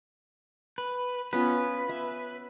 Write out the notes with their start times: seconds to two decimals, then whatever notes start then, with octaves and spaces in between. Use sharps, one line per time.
0.78 B4
1.33 B3 C#4 F4 B4
1.89 E5